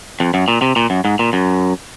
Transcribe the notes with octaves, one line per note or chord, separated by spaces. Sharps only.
F2
F#2
A#2
C3
A#2
F#2
G#2
A#2
F#2